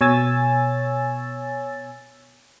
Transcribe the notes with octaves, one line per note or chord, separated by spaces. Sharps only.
B2 C#5 G#5 E6 A6